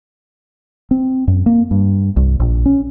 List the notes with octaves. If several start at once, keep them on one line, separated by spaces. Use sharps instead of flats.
C4
F#2
A#3
G2
C2
A#1
C#4